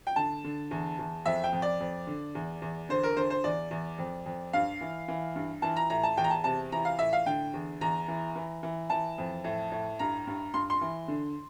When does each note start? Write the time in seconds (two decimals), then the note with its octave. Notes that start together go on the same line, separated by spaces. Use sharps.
0.07 G5
0.16 D3 A5
0.44 D3
0.71 E2
0.99 E2
1.26 F2 E5
1.44 G5
1.53 F2
1.62 D5
1.80 F2
2.07 D3
2.35 E2
2.62 E2
2.89 D3 C5
3.03 A#4
3.17 D3 C5
3.30 C5
3.44 E2 D5
3.71 E2
3.98 F2
4.26 F2
4.53 G2 F5
4.81 E3
5.08 E3
5.35 G2
5.62 E3 A5
5.76 A#5
5.90 A2 A#5
6.03 A5
6.17 E2 G5
6.24 A#5
6.30 A5
6.44 C3 A5
6.72 E3 A#5
6.85 F5
6.99 A2 E5
7.13 F5
7.26 D3 G5
7.54 E2
7.81 E2 A#5
8.08 E3
8.35 E3
8.63 E3
8.90 E3 A5
9.18 F2
9.44 A2
9.72 A2
9.99 G2 A#5
10.27 G2
10.54 G2 C6
10.70 C6
10.81 E3
11.08 D3